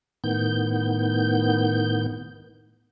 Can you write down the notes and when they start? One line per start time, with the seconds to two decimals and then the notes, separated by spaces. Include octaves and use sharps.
0.24 A2 D#3 B3 G6